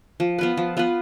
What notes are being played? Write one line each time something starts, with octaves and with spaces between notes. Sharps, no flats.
F3
B3 F4 B4
F3
B3 F4 B4